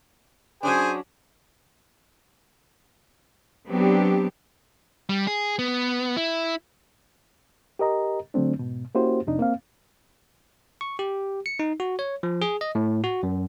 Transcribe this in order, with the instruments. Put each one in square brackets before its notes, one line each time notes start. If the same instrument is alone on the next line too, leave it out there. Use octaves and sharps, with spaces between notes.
[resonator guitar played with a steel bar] F#3 C#4 D4 [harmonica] G#4 C5 G#5
[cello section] F#3 B3 C4 D4 G4
[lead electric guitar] G3
G#4
B3
E4
[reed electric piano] G4 A#4 D#5 A#5
D3 F#3 A3 C4 D4
G#2 B2
A#3 C#4 E4 F#4 G4 C5
F2 C3 D4 D#4
A#3 C4 F5
[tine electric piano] C#6
G4
C#7
D#4
F#4
C#5
F3
G#4
D#5
A2
F#4
F#2